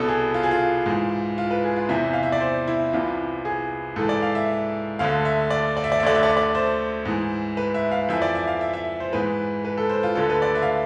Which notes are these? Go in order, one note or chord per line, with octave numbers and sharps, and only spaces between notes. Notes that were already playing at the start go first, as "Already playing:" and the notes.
Already playing: C2 B2 A4
G#4
F4
G#4
F4
G#2 E3
F4
B4
G#4
F4
E2 C3 E3 E5
F5
E5
D5
C5
E4
C2 C3 E3 F4
G#4
G#2 E3 A4
D5
F5
E5
D2 D3 F5
E5
D5
D5
E5
D5
E5
D2 D3 D5
E5
D5
E5
D5
C5
G#2 E3
B4
E5
F5
F2 E3 E5
D5
E5
F5
E5
E5
C5
G#2 E3 B4
B4
A4
C5
F4
D2 D3 A4
B4
D5
E5
F5